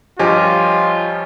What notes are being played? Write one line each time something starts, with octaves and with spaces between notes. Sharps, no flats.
G2 F3 F4 G4 C#5 D#5 G#5